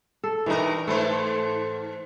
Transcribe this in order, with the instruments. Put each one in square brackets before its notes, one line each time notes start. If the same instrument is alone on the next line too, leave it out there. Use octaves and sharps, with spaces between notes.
[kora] A4
[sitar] G2 A#4 [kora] E3 D#4
[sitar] G#2 A4 C5 [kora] A3 B4